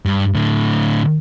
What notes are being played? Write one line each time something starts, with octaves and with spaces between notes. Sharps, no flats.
G2
A2 D3